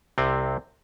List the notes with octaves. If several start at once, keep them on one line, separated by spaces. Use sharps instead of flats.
C2 C3 C4